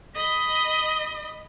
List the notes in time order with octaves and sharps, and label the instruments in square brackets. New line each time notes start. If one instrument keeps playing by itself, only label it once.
[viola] D#5 B5